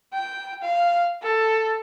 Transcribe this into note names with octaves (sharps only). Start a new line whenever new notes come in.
G5
F5
A4